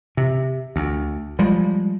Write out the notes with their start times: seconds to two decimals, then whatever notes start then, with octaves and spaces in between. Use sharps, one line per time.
0.17 C3
0.76 D2
1.39 F3 G3 G#3